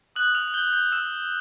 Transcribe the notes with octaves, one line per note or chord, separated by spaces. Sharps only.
D#6 F#6 G6 F#7
F6 F7
F#7
G6 G7
G6 G7
E6 E7